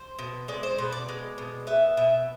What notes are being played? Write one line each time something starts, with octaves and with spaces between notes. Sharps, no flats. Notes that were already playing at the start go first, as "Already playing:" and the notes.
Already playing: C5
B2
G#3 D5
C5
B2 B4
D5
G#3
B2
B3 E5
B2 E5